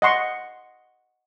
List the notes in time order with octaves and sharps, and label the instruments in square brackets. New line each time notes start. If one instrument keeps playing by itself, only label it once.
[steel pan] D#5 F#5 C6 C#6